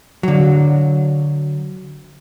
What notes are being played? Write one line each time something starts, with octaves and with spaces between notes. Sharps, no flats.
D3 F#3